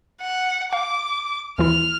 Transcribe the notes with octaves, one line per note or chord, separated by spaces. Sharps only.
F#5
F5 D6
D#2 E3 E4 F6